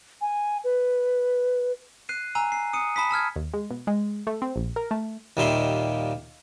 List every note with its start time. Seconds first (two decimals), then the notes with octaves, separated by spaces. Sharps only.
0.21 G#5
0.64 B4
2.09 F#6 C7 D#7
2.35 G#5 A#5 E6 D#7
2.52 C7
2.73 D#6 C#7 D#7
2.96 A5 B5 D#6 B6
3.11 A5 E6 F6 G#6
3.36 D#2
3.53 G#3
3.71 B2
3.87 G#3
4.27 A3
4.42 C4
4.56 A#1
4.76 A#4
4.91 A3
5.37 D#2 A#2 D#3 G3 E5 C6